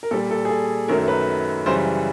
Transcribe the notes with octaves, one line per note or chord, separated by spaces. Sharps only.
A#4
A#2 G3 A4
A4
G#4
A4
F#2 D#3 F#3 A3 A#4
B4
F#2 C#3 E3 G3 C5